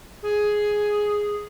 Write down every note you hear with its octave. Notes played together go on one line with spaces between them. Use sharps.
G#4